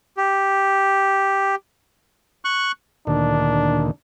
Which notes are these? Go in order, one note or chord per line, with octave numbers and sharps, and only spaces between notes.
G4
C#6 F#6
D2 A#2 D#3 D4